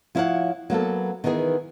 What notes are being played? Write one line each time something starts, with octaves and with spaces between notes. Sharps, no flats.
F3 E4 B4 C#5 F5 F#5
F#3 A#3 B3 A4
D#3 E3 B3 D#4 G#4